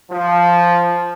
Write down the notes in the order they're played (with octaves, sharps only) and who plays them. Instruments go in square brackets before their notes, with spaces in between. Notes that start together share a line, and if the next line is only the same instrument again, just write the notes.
[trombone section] F3